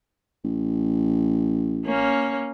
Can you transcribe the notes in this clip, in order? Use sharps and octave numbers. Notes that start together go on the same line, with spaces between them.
A1
A#3 C#4